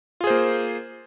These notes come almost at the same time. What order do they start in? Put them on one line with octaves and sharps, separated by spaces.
F4 G#4 C5 A#3